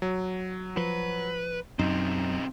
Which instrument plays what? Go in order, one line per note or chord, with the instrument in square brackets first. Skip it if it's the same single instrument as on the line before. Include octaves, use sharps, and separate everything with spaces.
[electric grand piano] F#3
[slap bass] F3 [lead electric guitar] B4
[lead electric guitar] B1 C4 [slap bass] F#2 [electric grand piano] D#4